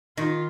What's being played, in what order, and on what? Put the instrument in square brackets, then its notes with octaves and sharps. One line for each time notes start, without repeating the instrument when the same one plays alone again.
[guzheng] D#3 [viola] F4